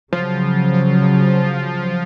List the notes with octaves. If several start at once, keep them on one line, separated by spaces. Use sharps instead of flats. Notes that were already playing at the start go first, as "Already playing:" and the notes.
C#3 F3 F#3